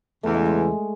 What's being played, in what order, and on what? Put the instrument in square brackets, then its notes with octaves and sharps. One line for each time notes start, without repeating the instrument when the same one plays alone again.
[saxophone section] E2 C#3 E3 [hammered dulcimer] A3
[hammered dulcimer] G#3
G#3